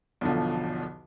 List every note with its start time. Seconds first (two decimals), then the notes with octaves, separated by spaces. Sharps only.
0.21 B1 E2 D3 F3